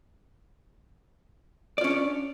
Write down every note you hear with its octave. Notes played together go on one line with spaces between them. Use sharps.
C#4 D4 F4 C#5 D5